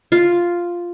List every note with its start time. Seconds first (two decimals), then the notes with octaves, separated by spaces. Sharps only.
0.12 F4